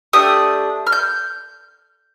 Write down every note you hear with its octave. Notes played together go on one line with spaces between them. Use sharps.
A3 D4 G4 D#6
F6
G6